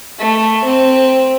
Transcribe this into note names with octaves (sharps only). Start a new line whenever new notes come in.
A3
C4